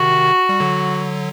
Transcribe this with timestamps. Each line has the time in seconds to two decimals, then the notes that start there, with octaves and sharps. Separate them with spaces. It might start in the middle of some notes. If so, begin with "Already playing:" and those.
Already playing: C3 D#3 F#4
0.49 G3
0.60 D3 F#3